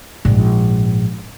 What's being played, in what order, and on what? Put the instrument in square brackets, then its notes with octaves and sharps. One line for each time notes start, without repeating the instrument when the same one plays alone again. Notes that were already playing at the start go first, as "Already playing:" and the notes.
[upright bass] A#1 G#2